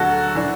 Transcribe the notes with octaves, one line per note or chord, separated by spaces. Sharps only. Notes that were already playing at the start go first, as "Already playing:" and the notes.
Already playing: D2 D3 F#3 F#4 A4
E3 D4